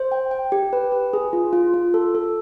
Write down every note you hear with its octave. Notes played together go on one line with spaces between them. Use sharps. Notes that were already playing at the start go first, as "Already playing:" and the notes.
Already playing: C5
G5
G5
G4
B4
B4
G#4
F4
F4
F4
A4
A4